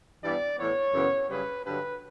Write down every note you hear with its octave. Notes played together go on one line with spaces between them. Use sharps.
G2 E3 G3 B3 D5
A2 E3 B3 C#5
F#2 C#3 E3 B3
F#2 C#3 G3 B4
G2 D3 F#3 B4